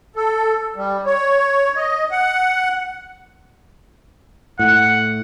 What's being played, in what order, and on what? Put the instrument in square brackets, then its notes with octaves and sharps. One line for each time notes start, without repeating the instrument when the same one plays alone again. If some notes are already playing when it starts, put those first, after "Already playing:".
[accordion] A4
G3
C#5
D#5
F#5
[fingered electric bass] A2 [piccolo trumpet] F#5